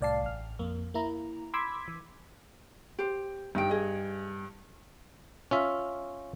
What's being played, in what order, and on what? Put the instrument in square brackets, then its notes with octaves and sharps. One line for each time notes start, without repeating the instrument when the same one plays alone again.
[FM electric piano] C2 A2 D5 F5 A5 C7
A1 F6
F2 A#3
A#3 E4 A#5
B5 C6 D6 E6 G#6 B6
E3
[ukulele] G4 C5
[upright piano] G2 [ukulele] D#4 G5
[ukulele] G#4 D#5
[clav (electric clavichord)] C#4 F4 E5